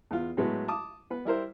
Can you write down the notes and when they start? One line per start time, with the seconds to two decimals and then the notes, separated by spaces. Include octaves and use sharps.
0.11 E2 F4
0.37 A2 F#3 G#3 A3 B3
0.68 A5 D6 D#6
1.10 B3 B4
1.25 G3 E4 A#4 C5